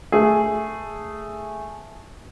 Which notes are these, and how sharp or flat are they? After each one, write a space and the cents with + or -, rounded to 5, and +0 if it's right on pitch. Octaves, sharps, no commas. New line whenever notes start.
A3 +0 G#4 +0